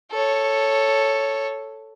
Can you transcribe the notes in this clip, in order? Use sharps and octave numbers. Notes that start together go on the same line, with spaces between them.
A4 C#5